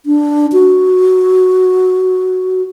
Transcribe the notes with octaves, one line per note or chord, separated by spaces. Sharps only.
D4
F#4